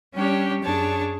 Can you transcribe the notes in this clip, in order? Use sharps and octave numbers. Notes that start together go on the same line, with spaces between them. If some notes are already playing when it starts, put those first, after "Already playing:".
G3 C#4 D4 G4 C#5
F#2 D4 G#4 C#5 A5